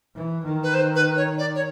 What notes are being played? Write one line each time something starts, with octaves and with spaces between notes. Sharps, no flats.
E3
D#3
B4
C5
B4
C#5
D5
C#5